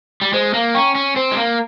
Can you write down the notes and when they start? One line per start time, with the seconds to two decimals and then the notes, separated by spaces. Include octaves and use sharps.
0.22 G3
0.33 G#3 C5
0.54 A#3
0.74 C#4 G5 A#5 C#6
0.95 C#4
1.16 C4 C5
1.32 G#3
1.37 A#3